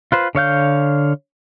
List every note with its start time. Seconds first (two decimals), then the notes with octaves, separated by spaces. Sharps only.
0.12 F4 B4 C5
0.35 D3 C#5 F5 G6